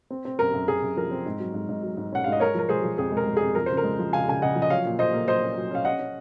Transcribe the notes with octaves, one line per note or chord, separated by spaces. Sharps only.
C4
C4
F#2 A#4
F#2
F#2 G#4
F#2
F3 A#4
C4
G#2
F#3
G#2
G#2
F#3
G#2
C#4 F#5
G#2 F5
D#5
G#3 A#4 C#5
F3 A#4
G#3 G#4 C5
F3
F2 G#4
G#3 A#4
G#3
G#4
F2
F3 A#4
C#3 C5
A#4
G#3
F3
C#3 F5 G#5
C#3 G#5
C#3 D#5 F#5
F3
D#5
F#3 C#5 F5
A#2
A#2 C5 D#5
A#3
F#3 C5 D#5
C#4
F#3
C#4 F5
C#4 D#5 F#5
C#4